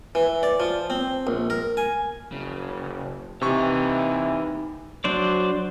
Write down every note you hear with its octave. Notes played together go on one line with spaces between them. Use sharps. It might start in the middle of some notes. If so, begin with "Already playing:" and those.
E3
D5
F3
C4
A#1
A#4
G#5
F#1 C#3
C3 E3 D#4 G4 C#6
F#3 D4 C5 D5